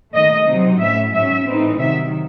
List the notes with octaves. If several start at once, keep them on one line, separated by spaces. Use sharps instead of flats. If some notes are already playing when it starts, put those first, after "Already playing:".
D#2 D#3 A3 D#5
C3 F#3 C4 D#4
A2 F#3 C#4 E5
G#2 F#3 C#4 E5
A2 E3 C4 D#4
C3 D#3 F#3 E5